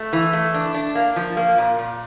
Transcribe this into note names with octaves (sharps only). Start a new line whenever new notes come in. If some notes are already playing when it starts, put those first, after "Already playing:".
Already playing: A3
E3
A3
D4
D4
A#3
F3
A#3
A#2
A#2